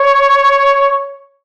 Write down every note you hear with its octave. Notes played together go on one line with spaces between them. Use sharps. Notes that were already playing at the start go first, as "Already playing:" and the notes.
Already playing: C#5